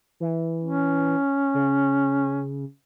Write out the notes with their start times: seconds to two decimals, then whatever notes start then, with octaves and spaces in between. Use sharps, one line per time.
0.20 E3
0.64 C#4
1.54 C#3